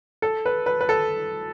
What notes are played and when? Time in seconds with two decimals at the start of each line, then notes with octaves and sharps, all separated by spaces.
0.22 A4
0.46 B4
0.66 B4
0.81 B4
0.89 A4